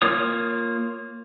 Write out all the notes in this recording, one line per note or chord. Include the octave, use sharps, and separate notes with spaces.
A#3 F4 C#5 D#6